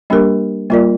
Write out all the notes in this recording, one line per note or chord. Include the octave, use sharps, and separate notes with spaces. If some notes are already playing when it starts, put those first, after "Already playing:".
G3 A#3 D4 G4 A#4
G3 A#3 F4 A#4 D5